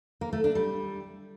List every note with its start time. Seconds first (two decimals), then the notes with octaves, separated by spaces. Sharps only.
0.21 A#3
0.33 A3
0.44 D4
0.55 G3